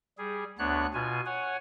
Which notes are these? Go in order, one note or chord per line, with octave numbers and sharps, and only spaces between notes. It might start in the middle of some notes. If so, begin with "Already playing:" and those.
G3 G#4
D2 B3 D4 C#5 F#6
B2 F4 G#5
C#5 F#5 G#5